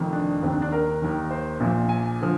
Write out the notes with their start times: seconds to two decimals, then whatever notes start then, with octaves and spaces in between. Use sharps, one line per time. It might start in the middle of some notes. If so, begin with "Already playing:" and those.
Already playing: F1 F2 D#3
0.13 D4
0.42 D#2 D#3 C4
0.52 D4
0.62 D4
0.72 A#4
1.02 D#2 D#3
1.31 C5
1.60 A#1 A#2 F3
1.89 G#5
2.21 D3 F3